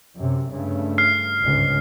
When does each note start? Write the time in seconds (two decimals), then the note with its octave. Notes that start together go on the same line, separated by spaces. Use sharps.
0.17 F#2 C3
0.52 G2 C#3 A3
0.98 F6 C7
1.42 G1 C#2 G#2